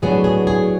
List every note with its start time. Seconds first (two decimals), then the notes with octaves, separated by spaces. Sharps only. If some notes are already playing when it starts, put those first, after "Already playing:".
0.02 A2 F#3 B3 D4 G#4
0.24 G#4
0.47 G#4